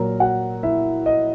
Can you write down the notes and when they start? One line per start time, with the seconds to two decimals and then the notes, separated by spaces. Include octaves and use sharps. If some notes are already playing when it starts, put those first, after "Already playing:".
Already playing: A#2 F#3 A#4 A#5
0.20 F#4 F#5
0.63 E4 E5
1.06 D#5